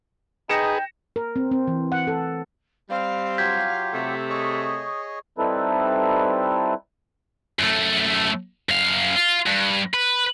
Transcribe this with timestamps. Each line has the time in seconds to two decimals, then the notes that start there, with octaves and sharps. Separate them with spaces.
0.49 D#4 G#4 B4 G5 A#6 C#7 E7
1.16 A#4
1.36 C4
1.51 C4
1.67 E3
1.92 F#5
2.07 A4
2.90 G3 C4 F5
3.38 F#3 F4 G4 G6 G#6 B6
3.93 C3 A3
4.29 G#4 C#5 D#5 C#6
5.38 G3 C4 D#4 E4 A4 B4
7.59 F#2 A3
8.69 F#2 F5
9.16 F4
9.47 G2
9.94 B4